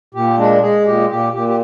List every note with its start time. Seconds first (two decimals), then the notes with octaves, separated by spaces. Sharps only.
0.14 A#2 G4
0.38 G#3 D4
0.62 G#3 G#4
0.86 A#2 G4
1.09 A#2 G4
1.33 A#2 G4
1.49 G4